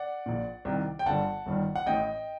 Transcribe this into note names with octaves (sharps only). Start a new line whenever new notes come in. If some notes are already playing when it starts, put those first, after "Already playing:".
Already playing: D5 F#5
A#1 A#2
C2 C3 D#3
G5
G1 G2 D3 F#5 A5
G1 G2 D#3
F#5
A1 A2 D#5 G5